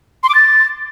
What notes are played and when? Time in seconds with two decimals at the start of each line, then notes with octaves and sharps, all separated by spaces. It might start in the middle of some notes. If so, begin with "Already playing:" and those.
0.23 C6
0.29 D6
0.35 A6